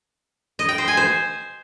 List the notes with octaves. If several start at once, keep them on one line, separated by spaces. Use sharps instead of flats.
D#5
G5
C5
G#5
C5